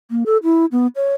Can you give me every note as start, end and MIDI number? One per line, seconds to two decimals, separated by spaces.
0.11 0.24 58
0.26 0.37 69
0.43 0.66 64
0.72 0.87 59
0.96 1.14 73